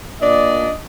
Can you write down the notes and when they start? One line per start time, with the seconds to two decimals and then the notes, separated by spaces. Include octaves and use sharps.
0.21 A#2 D4 D5 D#5